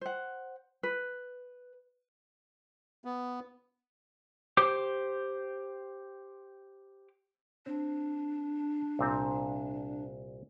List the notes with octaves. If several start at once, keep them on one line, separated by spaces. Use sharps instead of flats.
C5 F#5
B4
B3
G4 C5 D6
C4 D4
C2 A#2 C4